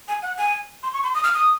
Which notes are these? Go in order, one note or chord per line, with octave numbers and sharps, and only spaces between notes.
G#5
F#5
G#5
C6
C#6
C6
D#6
F6
D#6